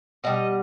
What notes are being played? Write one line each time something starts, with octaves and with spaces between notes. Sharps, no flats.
B2 G3 D#5